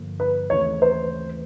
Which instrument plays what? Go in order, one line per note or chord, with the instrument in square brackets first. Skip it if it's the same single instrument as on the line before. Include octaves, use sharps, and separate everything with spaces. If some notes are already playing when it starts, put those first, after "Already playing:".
Already playing: [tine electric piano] G2 D3 F3 A#3
[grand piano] B4
[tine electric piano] D#2 C#3 E3 A3 C4 [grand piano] C#5
[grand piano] C5